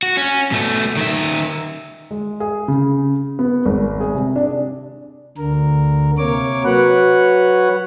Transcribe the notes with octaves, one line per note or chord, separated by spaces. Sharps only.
F#4
C#4
B2 A3
D#3 E5
G#3
G#4
C#3
B3
G#1
G#4
C3
D4
D2 D3 A#4
C3 A#3 A#4 C#5 D6
F#3 F#4 B4 C#5 F#5